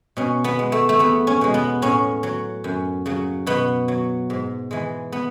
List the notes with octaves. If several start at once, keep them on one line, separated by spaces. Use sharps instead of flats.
B2 C#4
B3
G#3
A3
A3
E2 B3
C#4
B2 G#3
B3
A2 C#4
F#3
F#2
C#3 F#3
B2 B3
F#3
G#2
E3 G#3
B3